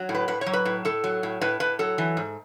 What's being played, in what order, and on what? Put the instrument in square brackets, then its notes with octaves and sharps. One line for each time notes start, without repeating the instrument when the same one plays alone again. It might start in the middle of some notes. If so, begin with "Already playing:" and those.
Already playing: [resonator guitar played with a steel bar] F#3
A2
B4
A2 B4
C#5
F#3
B4
A2
A2 A4
F#3
A2
A2 B4
A2 B4
F#3 A4
E3
G#2